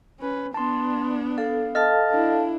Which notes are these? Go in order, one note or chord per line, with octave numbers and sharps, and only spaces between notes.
C#4 B4
B3 D4 A5 C6
A4 F5
A4 D#5 F5 A5 F6 A6
D4 E4